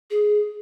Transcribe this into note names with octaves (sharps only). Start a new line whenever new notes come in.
G#4